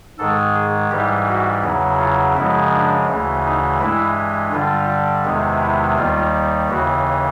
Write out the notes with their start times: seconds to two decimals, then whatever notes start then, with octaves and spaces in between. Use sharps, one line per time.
0.19 G#2 D#3 G#3 A4
0.55 G#4
0.91 G#2 E3 G3 G4
1.27 F#4
1.63 E2 C#3 F#3
1.99 F4
2.35 F#2 C#3 F3 G#3 E4
2.71 D4
3.07 D2 C#3 E3
3.44 D#4
3.80 G2 E3 G#3 E4
4.53 G2 D3 G3 F4
5.25 E2 C3 D#3 G#3
5.60 E4
5.98 D#2 D#3 G3 F4
6.70 D#2 C#3 E3 F#4